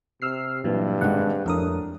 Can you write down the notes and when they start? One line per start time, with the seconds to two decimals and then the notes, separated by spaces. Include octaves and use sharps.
0.22 C3 E6 F6 C7
0.64 G2 A#2 E3 F#3
1.01 G#1 G#3 F#5
1.46 F2 A2 D4 A#4 D#6